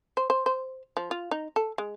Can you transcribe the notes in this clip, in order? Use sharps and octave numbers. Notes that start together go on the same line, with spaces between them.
C5
C5
C5
F3
F4
D#4
A4
G#3